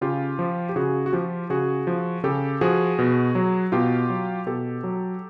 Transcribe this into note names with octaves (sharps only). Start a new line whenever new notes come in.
C#3 F4 G4
F3
G4
C#3 F#4 G#4
F#4
F3 F4 G4
C#3 F#4 G#4
F3
C#3 G4 A4
F3 F#4 G#4
B2
F#3
B2 F4 G4
F#3
B2 G4 A4
F#3